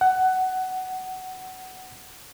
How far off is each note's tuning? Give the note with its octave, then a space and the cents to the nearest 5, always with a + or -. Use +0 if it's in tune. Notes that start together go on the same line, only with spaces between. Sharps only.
F#5 +15